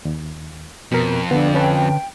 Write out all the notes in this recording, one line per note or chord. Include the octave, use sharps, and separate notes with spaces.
D#2
F2 B2 A#4
D3 B3 D4 A4
C#4 B4 G5 A5